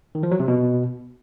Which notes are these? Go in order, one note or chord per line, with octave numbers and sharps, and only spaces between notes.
D#3
F3
F#3
C3
B2